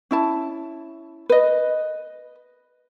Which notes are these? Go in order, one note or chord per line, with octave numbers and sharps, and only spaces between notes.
C#4 E4 A5
B4 D#5